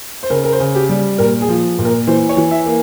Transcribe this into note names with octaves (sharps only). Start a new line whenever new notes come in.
C5
C#3 A#4
A#4
C5
C#3
G4
G3
A#2 A#4
G#4
F3
A#2
A#4
E3 C5
C#5
E3
E5
A#3